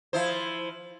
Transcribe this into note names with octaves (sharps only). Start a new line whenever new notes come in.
F3 E4 C5